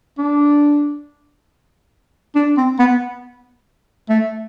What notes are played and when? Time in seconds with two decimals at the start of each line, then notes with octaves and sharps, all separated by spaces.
0.18 D4
2.35 D4
2.57 C4
2.79 B3
4.09 A3